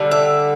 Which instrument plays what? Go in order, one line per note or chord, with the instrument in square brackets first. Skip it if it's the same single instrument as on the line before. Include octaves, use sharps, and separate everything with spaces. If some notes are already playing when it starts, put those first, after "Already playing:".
Already playing: [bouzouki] D3 G3
E5